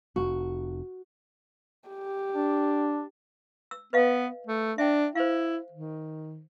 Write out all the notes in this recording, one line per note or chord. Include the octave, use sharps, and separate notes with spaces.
F1 F#4
G4
D4
E6
B3 B4 D#5 F5
A3
D4 E5 G5
E4 C5 F5
D#3